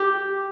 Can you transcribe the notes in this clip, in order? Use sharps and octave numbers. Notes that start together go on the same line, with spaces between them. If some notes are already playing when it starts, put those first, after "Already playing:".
Already playing: G4